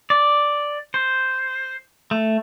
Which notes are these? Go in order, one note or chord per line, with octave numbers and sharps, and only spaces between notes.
D5
C5
A3